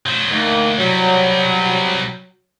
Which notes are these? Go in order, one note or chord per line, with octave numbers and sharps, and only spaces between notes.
F#3 C5
D2 D#3 A#3
C3 F#3 G3